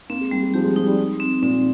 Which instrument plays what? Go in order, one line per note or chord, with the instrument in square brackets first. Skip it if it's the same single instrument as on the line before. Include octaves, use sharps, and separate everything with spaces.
[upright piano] A#3 [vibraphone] C4
[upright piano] G#3
[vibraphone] G3 [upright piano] A#3
[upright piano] G#3
[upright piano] F3 [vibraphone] G4
[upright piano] G#3
[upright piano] F3 [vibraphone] D#4
[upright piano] G3
[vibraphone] D#4
C4
[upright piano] A#2 [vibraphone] C4